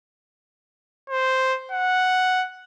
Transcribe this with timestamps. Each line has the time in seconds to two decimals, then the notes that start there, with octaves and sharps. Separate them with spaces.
1.10 C5
1.72 F#5